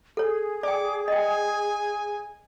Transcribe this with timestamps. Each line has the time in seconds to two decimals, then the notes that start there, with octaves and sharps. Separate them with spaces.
0.17 G#4 A4 C#5
0.63 D5 G5 D6
1.08 D#5 G5 G#5